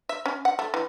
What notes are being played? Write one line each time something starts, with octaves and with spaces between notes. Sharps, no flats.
E5
C#4
F#5
A3
E3